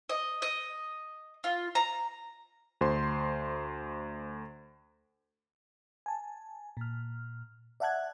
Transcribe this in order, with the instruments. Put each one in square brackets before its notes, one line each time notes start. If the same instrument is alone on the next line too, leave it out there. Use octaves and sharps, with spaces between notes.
[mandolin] D#5
D#5
F4
A#5
[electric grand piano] D2 C5 C6
[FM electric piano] G#5 A5
A#2 F6
D5 E5 F#5 A5 F#6 G#6